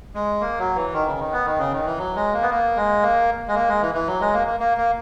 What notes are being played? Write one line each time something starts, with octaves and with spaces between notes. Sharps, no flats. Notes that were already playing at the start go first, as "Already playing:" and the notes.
G#3
A#3
F#3
E3
D#3
C#3
D#3
B3
D#3
C#3
D#3
E3
F#3
G#3
A#3
B3
A#3
G#3
A#3
G#3
A#3
G#3
E3
E3
F#3
G#3
A#3
A#3
A#3
A#3